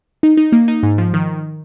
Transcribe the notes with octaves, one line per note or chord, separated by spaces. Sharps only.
D#4
D#4
A#3
D#4
G#2
F3
D#3